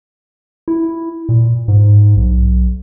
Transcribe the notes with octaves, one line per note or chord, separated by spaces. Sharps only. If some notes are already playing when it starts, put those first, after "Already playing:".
E4
A#2
G#2
B1